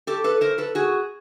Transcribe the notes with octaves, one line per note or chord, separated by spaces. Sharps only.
G4 A4
A4 B4
A#4 C5
A4 B4
F#4 G#4